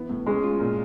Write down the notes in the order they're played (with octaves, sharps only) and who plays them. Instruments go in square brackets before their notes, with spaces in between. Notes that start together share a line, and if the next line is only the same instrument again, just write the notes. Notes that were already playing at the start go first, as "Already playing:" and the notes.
Already playing: [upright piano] E3 B3
A2
[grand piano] G#3 [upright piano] C#4
[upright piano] F4
A#2